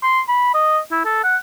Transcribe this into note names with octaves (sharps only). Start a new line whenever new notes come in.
C6
B5
D#5
E4
A4
F#5